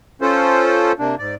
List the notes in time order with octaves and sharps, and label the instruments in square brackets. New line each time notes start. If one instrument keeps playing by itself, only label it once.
[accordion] C#4 F4 A4 C5
C3 A#3 D4
G#2 D5